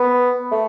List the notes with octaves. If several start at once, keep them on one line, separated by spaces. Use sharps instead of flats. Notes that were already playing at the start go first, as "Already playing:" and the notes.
Already playing: B3
A3